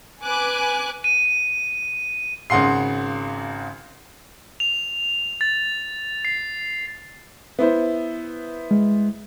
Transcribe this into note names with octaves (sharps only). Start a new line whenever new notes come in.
B4 G#5 D6 F#6
D#7
G#1 C#3 F#5 C6 C7
F7
A6
C7
B3 E4 C5
G#3